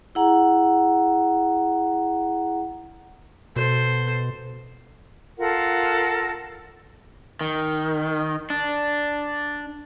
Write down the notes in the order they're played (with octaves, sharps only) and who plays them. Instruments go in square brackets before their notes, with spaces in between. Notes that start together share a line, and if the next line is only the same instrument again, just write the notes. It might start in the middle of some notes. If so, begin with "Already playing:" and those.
[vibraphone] E4 G#4 F#5 A#5
[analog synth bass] B2 [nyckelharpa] A4 C5
[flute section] F4 A4 A#4 F#5
[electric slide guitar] D#3
D4